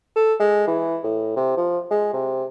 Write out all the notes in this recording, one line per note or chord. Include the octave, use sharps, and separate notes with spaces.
A4
G#3
E3
A2
C3
F3
G#3
C3